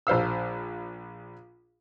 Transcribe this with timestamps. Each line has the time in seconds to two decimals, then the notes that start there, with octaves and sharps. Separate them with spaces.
0.07 A#1 C5 F5 E6